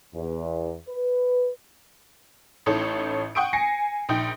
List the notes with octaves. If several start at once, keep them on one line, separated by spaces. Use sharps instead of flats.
E2
B4
A1 A2 D#4 A4 C#5
F#5 G5 C#6 D#6 D7
G#5 A#6 C7 C#7
A#1 D#4 G5